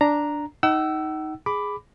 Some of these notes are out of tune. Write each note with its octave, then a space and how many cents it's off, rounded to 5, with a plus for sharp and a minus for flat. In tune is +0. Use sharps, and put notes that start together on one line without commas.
D4 +0 A#5 +0
D#4 +10 F#5 +45 E6 +5
G#4 +0 B5 +10 D6 +0